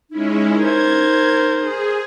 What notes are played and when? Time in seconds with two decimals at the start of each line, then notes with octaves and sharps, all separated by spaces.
0.10 G#3 C#4 D#4 E4
0.59 A#4 C5 G#6
1.59 G#4